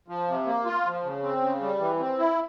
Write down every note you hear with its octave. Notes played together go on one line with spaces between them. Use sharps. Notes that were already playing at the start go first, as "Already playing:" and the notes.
F3
C3
A#3
F4
F3
C#3
C4
C#3
G3
E3
C4
E4